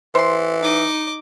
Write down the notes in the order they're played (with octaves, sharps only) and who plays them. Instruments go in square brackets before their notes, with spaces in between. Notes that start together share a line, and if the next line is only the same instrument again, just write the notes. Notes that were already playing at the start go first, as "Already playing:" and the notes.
[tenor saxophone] E3 [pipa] C5 C6
[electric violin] D#4 [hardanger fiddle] D#5 D6